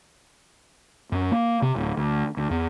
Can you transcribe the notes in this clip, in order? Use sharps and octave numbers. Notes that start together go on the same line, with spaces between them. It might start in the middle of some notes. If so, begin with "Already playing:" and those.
F#2
A#3
C3
D1
D2
D2
E2